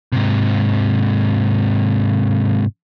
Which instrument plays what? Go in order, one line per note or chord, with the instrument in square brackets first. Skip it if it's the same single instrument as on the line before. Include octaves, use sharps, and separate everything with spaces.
[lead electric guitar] G#2 C3